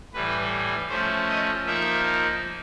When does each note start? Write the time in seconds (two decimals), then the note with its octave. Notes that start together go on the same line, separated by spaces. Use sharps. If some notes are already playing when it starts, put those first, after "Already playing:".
0.13 A2 E3 G3 B4
0.89 F3 A3 C#4 C5
1.28 D#5
1.66 F3 A#3 D#4 E5